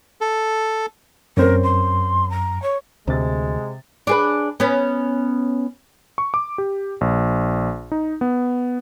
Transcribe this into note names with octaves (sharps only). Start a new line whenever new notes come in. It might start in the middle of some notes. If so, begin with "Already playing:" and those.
A4
F#2 A#3 C4 C#4 A#4
C6
A#5
C#5
D2 C3 G#3 A6
D4 G#4 B4
B3 C#4
C#6
D6
G4
A#1
D#4
B3